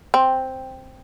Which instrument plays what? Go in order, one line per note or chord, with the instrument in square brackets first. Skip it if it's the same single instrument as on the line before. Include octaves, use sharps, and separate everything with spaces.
[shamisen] C4